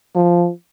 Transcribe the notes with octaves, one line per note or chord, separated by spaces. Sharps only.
F3